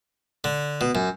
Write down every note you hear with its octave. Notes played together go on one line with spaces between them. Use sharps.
D3
B2
F#2